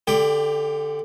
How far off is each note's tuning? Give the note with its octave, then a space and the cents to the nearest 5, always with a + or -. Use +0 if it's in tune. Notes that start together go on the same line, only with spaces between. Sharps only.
D3 +0 G4 +25 G5 +0